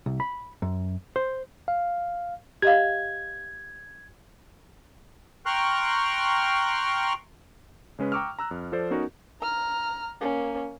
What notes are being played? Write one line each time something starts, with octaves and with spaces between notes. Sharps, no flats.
C2
B5
F#2
C5
F5
G4 D#5 F5 G#6
G5 A#5 C6 C#6 F6 F#6
C#3 G#3 C#4 B4
G5 A#5 C#6 D6 E6 F6
A#5 E6 F#6
F2
F3 A4 C5 D5
B3 C#4 D#4 F#4 A#4
A#5 F6
A#3 C#4